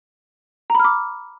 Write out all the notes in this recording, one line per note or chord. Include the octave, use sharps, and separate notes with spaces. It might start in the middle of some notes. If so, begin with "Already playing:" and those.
A#5 B5 D6 F6